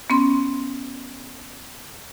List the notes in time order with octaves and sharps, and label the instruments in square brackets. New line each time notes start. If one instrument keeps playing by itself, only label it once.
[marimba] B3 C#4 C6